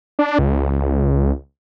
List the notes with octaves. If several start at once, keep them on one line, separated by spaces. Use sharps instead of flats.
D4
C#2